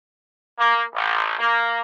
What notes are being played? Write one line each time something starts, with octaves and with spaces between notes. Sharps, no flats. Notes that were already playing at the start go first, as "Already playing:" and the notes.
A#3
A1
A#3